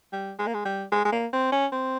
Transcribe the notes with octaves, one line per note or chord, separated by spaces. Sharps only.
G3
G#3
A#3
G#3
G3
G#3
G#3
A#3
C4
C#4
C4